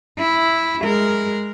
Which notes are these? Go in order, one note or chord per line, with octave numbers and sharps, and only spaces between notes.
E4
G#3 A#4